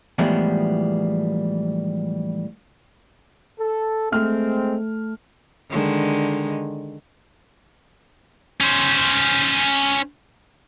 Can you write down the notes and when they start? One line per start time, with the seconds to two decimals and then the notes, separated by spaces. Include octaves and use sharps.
0.18 A2 E3 F3 G3 G#3 B3
3.59 A4
4.12 G#3 A3 C4 F6
5.71 D3 D#3 G#3
8.60 C#4 C5